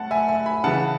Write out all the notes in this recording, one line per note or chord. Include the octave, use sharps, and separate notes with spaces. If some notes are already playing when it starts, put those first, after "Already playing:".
Already playing: A2 F#5 A5
E5 G#5
E5 G#5
G#5 B5
C#3 E3 F#5 A5